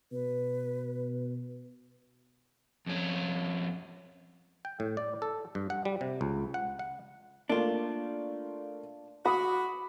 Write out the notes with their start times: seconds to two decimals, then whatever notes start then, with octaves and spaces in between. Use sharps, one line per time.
0.12 B2 B4
2.86 F2 C#4
4.65 G5
4.80 A2
4.97 D5
5.22 A4
5.55 G2
5.70 F#5
5.85 G3
6.01 C3
6.21 C#2
6.54 F#5
6.79 F#5
7.49 A3 A#3 D4 F4
9.25 F#4 B5 D6 D#6